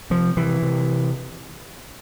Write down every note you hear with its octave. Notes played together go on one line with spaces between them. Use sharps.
C3 F3
C3 E3
C3